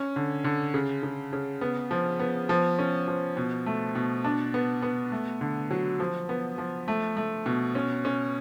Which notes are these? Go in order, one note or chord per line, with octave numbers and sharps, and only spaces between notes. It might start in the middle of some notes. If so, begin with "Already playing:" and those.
Already playing: C#4
D3
D3
C#3
C#3
C#3
B3
F3
B3
F3
C#4
F3
B2
A3
B2
D4
B3
B3
A3
D3
F#3
F3
B3
F3
A3
A3
B2
C#4
C#4